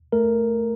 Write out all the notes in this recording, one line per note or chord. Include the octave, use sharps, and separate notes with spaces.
A3 A#4